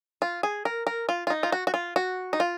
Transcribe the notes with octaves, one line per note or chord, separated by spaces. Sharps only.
F4
G#4
A#4
A#4
F4
F4
D#4
F4
F#4
F#4
F4
F#4
D#4
F4